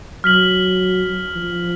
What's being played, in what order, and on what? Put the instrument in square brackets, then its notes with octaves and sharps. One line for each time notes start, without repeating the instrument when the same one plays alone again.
[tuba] F#3 [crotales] F6 B6 F#7
[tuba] F3